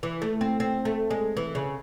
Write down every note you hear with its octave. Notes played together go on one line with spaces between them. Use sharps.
E3
A3
C4
C4
A3
G#3
E3
C#3